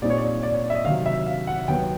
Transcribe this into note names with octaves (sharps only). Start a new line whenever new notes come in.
A#2 G3 C4 D#4 D5
C#5
D5
D5
C#5
D5
E5
D#5
C3 D#3 F#3 F5
E5
F5
F#5
D#2 D#3 F#3 B3 G5